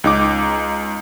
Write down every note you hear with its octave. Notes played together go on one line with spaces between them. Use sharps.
C#2 D#4 D6